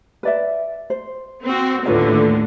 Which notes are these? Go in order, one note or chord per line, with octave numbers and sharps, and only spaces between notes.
B4 D5 E5
C5
C4 F#4
D#2 A2 D3 F4 B4 C#5